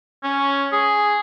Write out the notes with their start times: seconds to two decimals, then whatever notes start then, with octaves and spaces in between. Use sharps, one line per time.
0.24 C#4
0.72 G#4